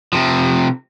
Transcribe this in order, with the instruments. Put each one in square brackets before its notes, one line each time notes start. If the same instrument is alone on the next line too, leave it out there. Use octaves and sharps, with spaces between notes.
[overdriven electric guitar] C3 F3